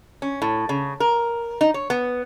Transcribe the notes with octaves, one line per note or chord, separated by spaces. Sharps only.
C#4
A2
C#3
A#4
D#4
C#5
B3